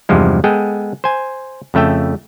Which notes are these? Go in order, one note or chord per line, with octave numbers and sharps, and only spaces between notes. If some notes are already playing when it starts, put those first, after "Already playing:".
E2 G2 C3 F3 G#3
G#3 B3 G#4 A4 G5
C5 G#5
F2 C#3 A3 E5 G5